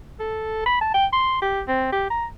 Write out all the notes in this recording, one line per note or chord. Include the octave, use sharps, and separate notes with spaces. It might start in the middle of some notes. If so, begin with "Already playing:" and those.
A4
B5
A5
G5
C6
G4
C4
G4
A#5